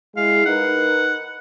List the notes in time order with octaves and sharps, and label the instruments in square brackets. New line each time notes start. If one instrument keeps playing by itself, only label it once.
[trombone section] G#3 E4 [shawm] F5
[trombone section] D#4 A#4 B4 [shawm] F#5